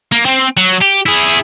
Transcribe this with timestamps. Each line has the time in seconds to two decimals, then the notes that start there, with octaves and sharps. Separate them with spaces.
0.12 A#3
0.25 C4
0.57 F#3
0.81 G4
1.06 E4 G#4